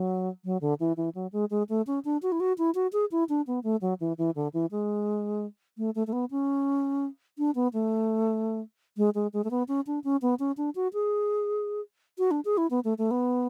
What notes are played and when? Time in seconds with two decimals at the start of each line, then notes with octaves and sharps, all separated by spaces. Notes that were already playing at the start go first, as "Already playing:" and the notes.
Already playing: F#3
0.45 F#3
0.61 D3
0.80 E3
0.97 E3
1.15 F#3
1.33 G#3
1.51 G#3
1.69 A3
1.87 C#4
2.05 D4
2.23 F#4
2.32 E4
2.40 F#4
2.58 E4
2.75 F#4
2.93 G#4
3.12 E4
3.29 D4
3.47 B3
3.64 A3
3.81 F#3
4.00 E3
4.18 E3
4.36 D3
4.53 E3
4.71 G#3
5.78 A3
5.95 A3
6.07 A3
6.13 B3
6.31 C#4
7.38 D4
7.55 B3
7.73 A3
8.97 G#3
9.15 G#3
9.33 G#3
9.44 A3
9.51 B3
9.68 C#4
9.87 D4
10.04 C#4
10.22 B3
10.39 C#4
10.57 D4
10.75 F#4
10.93 G#4
12.18 F#4
12.31 D4
12.45 G#4
12.58 E4
12.71 B3
12.84 A3
12.98 A3
13.11 B3